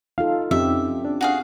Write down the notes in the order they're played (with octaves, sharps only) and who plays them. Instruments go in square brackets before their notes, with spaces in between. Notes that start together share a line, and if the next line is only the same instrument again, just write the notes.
[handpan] D#4 F4 A4 [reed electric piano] F5
[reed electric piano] F2 D#4 [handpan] C4 C#4 G4 [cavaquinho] E5
[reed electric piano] D4
[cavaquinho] F#4 G#4 F5